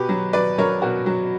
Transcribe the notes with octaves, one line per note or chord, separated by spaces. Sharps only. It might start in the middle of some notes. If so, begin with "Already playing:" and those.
Already playing: B2 G4 B4
F#3
F#3 B4 D5
F#3 A#4 C#5
B2 F#4 A#4
F#3